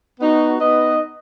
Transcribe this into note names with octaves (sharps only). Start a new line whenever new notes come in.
B3 D#4 F#4
B3 D#4 B4 D#5